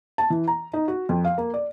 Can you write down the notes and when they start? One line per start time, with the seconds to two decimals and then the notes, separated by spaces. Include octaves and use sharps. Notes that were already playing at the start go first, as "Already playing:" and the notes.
0.18 A5
0.30 E3
0.48 A#5
0.73 D#4
0.88 F#4
1.09 F2
1.25 F5
1.38 A#3
1.54 D5